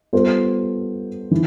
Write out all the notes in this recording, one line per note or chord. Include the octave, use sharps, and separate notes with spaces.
G3 B3 F4 A4 C5
E3